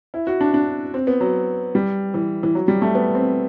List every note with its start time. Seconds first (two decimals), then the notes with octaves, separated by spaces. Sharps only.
0.14 E4
0.27 F#4
0.41 D4
0.54 D4
0.94 C4
1.07 B3
1.21 F#3
1.75 G3
2.14 E3
2.43 E3
2.55 F#3
2.68 G3
2.82 A3
2.95 B3
3.15 C4